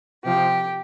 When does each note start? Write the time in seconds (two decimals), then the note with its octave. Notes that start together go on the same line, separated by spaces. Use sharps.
0.24 C3 F3 G4